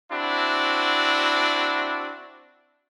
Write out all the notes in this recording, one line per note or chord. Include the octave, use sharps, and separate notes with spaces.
C4 D4 E4 F#4